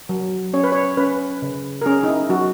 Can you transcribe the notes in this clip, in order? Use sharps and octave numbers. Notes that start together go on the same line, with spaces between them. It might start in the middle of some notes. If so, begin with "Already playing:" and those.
F#3
C#4 C#5
B4
C#5
C#4 B4
C#3
A#4
C#4 G#4
D#4
E4
F#3 F#4